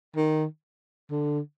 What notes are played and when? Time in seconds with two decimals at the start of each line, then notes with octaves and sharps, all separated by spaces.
0.16 D#3
1.11 D3